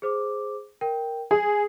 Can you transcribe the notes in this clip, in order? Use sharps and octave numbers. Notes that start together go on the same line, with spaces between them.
G#4 C5 D6
A#4 G5
G#4 G#5